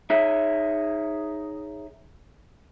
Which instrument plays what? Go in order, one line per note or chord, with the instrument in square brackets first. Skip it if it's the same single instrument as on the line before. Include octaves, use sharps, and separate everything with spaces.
[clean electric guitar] D#4 G#4 C#5 E5